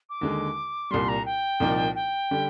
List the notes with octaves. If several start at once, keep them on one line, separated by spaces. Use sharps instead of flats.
D6
D#2 D3 G#3
C2 A#2 G3 C6
A#5
G5
C2 A#2 F3 A#3 D#4
G5
D3 G3